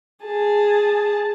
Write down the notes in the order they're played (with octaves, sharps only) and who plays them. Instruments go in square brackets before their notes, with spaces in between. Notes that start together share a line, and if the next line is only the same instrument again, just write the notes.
[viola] G#4 A5